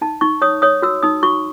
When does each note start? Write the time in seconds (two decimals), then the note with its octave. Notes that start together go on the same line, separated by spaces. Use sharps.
0.01 D#4 A5
0.21 D#4 C#6
0.42 C#5 D#6
0.62 C#5 D#6
0.82 F#4 E6
1.03 D#4 D#6
1.23 F#4 C#6